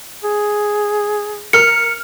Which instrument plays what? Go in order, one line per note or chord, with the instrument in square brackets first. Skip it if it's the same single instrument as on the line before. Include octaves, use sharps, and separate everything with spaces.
[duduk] G#4
[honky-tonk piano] A#4 F6 [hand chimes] C#7